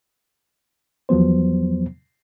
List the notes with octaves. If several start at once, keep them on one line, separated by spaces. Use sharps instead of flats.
E2 F3 F#3 B3 C5